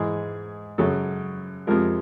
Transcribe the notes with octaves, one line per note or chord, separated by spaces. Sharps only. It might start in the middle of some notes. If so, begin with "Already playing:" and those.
Already playing: G#2 E3 G#3 G#4
F#2 C#3 F#3 A4
F2 C3 F3 G#3 A#4